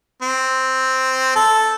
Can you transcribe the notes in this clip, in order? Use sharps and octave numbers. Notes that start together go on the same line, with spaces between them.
C4
A4